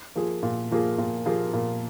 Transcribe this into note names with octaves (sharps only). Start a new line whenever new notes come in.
F3 A#3 F4 G#4
A#2
F3 A#3 F4 G#4
A#2
F3 A#3 F4 G#4
A#2